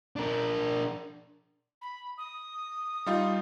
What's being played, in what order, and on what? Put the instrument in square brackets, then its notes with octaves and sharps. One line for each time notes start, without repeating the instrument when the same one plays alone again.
[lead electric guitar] D4 A#4
[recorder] B5
D#6
[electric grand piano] G3 D#4 F4